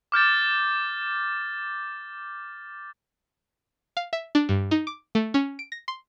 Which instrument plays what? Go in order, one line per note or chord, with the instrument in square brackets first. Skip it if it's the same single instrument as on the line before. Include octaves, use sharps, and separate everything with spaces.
[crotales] D6 F6 G6 A6
[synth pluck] F5
E5
D4
G2
D#4
D6
A3
C#4
D7
A#6
C6